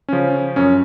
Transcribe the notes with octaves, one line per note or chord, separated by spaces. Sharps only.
C#3 F3 C#4
F#2 C#4